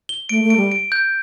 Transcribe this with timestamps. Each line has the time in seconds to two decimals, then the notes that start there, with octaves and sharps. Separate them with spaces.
0.09 G7
0.29 A3 D7
0.44 A3
0.50 D7
0.57 G3
0.72 D7
0.92 G6